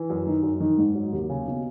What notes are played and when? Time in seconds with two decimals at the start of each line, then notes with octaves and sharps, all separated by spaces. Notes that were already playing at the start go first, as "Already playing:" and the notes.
Already playing: E3
0.10 F#2
0.27 D#3
0.43 F#2
0.60 D#3
0.78 G#2
0.95 F#3
1.13 D#2
1.29 C#3
1.47 B2